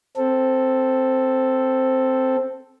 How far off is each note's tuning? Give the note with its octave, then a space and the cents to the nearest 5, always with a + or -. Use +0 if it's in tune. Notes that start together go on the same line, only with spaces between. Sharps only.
C4 +0 A4 +0